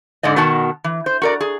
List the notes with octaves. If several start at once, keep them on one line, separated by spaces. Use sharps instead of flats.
G#2 D3 D5 D#5
B2 D#3 B3 F#4 A5
E3
C5
F#4 A#4 D5
G#4